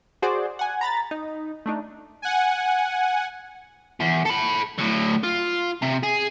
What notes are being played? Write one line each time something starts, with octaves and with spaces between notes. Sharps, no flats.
F#4 G#4 C5 D5
F#5 G#5
A#5 B5 A6
D#4
A3 D4 D#4
F#5 G#5
E2
A4 B5
A2 D3
F4
C3
G#4